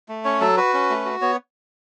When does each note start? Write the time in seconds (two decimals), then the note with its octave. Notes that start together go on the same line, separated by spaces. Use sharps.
0.08 A3
0.25 C#4 C#5
0.41 F#3 A4
0.57 F#4 B4
0.74 C#4
0.90 A3
1.05 F#4
1.22 B3 C#5